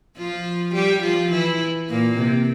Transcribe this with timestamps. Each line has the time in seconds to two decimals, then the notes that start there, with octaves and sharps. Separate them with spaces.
0.17 F3 F4
0.74 G3 G4
1.03 F3 F4
1.31 E3 E4
1.90 A#2 A#3
2.18 C3